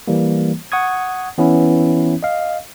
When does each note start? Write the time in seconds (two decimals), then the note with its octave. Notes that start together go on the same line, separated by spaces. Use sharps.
0.08 E3 G3 A#3
0.72 F#5 C#6 D#6 G#6
1.38 E3 B3 C#4 E4
2.23 D#5 F5